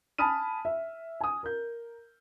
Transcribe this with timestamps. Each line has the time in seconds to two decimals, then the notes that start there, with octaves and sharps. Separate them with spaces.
0.18 G#5 A5 B5 D#6 F6 D#7
0.65 E5
1.21 G#5 D#6
1.43 A#4 G6